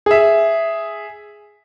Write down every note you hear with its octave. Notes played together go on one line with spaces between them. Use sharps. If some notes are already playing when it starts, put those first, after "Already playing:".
G#4 E5